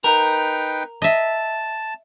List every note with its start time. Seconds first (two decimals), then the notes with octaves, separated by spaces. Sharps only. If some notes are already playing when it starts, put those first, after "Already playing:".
0.04 D#4 A#4 B4 G5
1.02 D#5 E5 A5